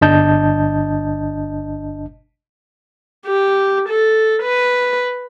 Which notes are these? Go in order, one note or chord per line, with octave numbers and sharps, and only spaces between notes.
G1 D4 D#5 A5 G6
G4
A4
B4